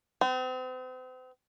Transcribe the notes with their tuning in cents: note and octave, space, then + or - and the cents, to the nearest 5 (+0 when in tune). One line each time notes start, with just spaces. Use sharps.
C4 -40